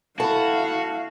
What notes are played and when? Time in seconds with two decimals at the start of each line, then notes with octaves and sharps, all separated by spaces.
0.20 E4 F#4 A4 F5 A5 B5